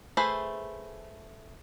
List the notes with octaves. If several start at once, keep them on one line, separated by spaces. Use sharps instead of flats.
A3 G#4 B4 C5 E5